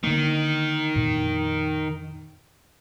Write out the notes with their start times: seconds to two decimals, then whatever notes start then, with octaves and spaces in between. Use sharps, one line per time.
0.04 D3 D#3 A#3
0.95 F2 A#2